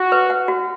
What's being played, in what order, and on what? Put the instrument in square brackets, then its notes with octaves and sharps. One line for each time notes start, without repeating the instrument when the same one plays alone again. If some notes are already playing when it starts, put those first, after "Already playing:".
Already playing: [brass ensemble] F#4
[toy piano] B4
F#5
F#4